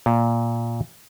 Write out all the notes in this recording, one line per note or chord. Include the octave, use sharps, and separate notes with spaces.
A#2